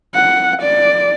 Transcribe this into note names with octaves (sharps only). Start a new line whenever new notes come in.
F#5
D5